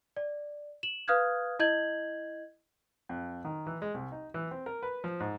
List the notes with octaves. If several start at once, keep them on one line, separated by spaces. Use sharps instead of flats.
D5
E7 F#7
B4 F5 D#6 F6 F#6 G#6
E4 D#5 G6 G#6 F#7
F2
D#3
E3
G#3
C2
D#4
E3
C4
A#4
B4
F3
G#2